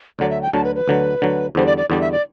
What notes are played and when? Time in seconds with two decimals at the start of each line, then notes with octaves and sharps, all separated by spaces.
0.19 D2 D3 F#3 D5
0.30 E5
0.42 G5
0.53 D2 D3 F#3 A5
0.64 B4
0.75 B4
0.88 D2 D3 F#3
1.22 D2 D3 F#3
1.55 E2 D3 G3 C5
1.66 D5
1.77 D5
1.90 E2 D3 G3 D5
2.01 E5
2.12 D5